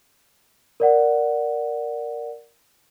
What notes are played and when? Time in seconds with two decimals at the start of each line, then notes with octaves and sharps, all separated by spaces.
0.80 A#4 D5 F#5